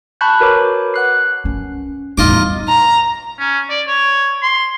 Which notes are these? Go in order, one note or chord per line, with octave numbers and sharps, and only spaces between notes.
A5 B5 C#6 F#6 G6
F#4 A#4 B4 C#5 D6
F#5 F#6 C7
C#4
E2 A2 G3 D#4 F4 D#5 D6
A#5
C#4
D5
C#5
C6